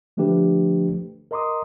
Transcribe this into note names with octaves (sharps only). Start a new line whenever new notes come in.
D3 F3 A3 D4 G4 B4
A#4 D#5 A#5 C6 D6 D#6